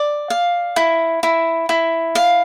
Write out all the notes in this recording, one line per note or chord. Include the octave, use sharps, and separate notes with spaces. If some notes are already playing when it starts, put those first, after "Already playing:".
Already playing: D5
F5
E4
E4
E4
F5